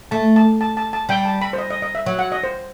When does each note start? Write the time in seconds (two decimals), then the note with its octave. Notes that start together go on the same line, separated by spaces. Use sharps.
0.11 A3 A5
0.36 A5
0.61 A5
0.77 A5
0.93 A5
1.09 G3 G5
1.25 A5
1.41 B5
1.53 C5
1.58 D#5
1.70 D#5
1.82 D#5
1.95 E5
2.06 F#3
2.19 F#5
2.32 D#5
2.43 C5